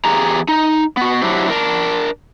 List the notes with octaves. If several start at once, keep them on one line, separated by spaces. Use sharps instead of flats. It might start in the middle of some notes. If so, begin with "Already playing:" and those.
E2 G4 G#4 A#5
D#4
B3 F#4
F#3 D4 E4 F#4 G4 C5
D4 A#4